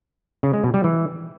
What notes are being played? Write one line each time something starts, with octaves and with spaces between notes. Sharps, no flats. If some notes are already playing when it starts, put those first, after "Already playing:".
C#3
G#3
B2
G3
E3